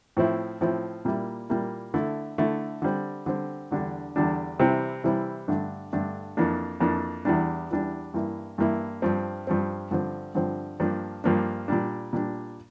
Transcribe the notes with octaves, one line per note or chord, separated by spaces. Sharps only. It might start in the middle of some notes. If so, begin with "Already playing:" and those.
A2 F3 C4 E4
A2 F3 C4 E4
A#2 G3 A#3 E4
A#2 G3 A#3 E4
D3 A3 E4
D3 A3 E4
D3 G3 C4
D3 G3 C4
E2 D3 G3 D4
E2 D3 G3 D4
C3 E3 G3 C4 E4
C3 E3 G3 C4 E4
G2 D3 A3 D4
G2 D3 A3 D4
F2 E3 A#3 D4
F2 E3 A#3 D4
E2 E3 G3 D4
E2 E3 G3 D4
G2 E3 A#3 E4
G2 E3 A#3 E4
G2 F3 C4
G2 F3 C4
G2 D3 F3 C4
G2 D3 F3 C4
G2 F3 A#3 D4
G2 F3 A#3 D4
A#2 G3 D4
A#2 G3 D4